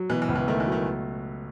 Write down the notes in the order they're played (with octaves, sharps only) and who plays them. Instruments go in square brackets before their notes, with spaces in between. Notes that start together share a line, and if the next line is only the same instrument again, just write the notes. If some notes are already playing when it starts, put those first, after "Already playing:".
Already playing: [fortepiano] F#3
[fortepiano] B2 [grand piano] E3
[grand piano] E3
[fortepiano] C#2
[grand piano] E3
[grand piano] D#3 [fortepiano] A3
[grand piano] E3
[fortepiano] F#3
[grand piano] D#3